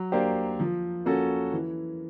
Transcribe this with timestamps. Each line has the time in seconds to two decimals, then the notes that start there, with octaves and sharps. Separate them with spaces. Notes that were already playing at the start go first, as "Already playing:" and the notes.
Already playing: F#3
0.12 A#3 D4 G4 C5
0.60 F3
1.06 A#3 C#4 F#4 A4
1.52 E3